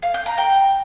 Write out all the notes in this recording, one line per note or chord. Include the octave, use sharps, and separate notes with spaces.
F5
G6
A#5
G5